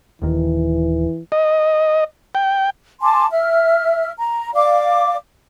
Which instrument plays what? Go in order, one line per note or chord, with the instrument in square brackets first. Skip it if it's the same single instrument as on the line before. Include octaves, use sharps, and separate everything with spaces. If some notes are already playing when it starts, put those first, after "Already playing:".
[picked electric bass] D#1 D#2 D#3 [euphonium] E3
[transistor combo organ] D#5
G5
[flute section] G#5 A5 C6 D6
E5 F6
A#5
D5 F5 D6